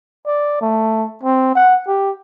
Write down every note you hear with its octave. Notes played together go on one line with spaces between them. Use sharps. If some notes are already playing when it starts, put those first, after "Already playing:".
D5
A3
C4
F#5
G4